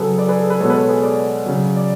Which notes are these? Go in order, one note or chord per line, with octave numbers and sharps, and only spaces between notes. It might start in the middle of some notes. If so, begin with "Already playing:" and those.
Already playing: C#3 F#3 G#4 A4 B4
B4 D5
G#4 B4
A4
G#4 B4
B2 G#3 A4 C#5
B4
A4 C#5
G#4 B4
B4 D5
C#3 F#3
D5